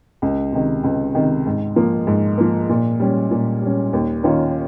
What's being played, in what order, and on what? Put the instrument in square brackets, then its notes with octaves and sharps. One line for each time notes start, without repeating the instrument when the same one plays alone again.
[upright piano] C#2
C3 D#3
C#2
C3 D#3
G#2
F3 A#3
G#2
F3 A#3
A#2
G3 C#4
A#2
G3 C#4
D#2
D#3 A#3 C#4 F4